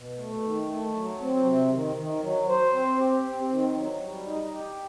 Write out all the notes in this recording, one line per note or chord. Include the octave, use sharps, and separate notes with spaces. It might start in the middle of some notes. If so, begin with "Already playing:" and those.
Already playing: B2
A3
D#3
A3
F#3
C4
C3
D#3
D#3
F#3
C5
C4
G4
C4
D#3
F#3
G3
D#4
G4